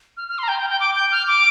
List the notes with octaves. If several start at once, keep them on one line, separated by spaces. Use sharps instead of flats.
F6
F6
C6
A#5
G5
G5
G5
D6
G6
F6
D6